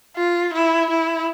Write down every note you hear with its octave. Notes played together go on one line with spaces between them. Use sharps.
F4
E4
E4